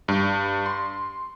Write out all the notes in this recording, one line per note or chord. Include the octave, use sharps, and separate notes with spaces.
G2
C6